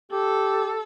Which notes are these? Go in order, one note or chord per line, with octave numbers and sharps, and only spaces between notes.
G4 A4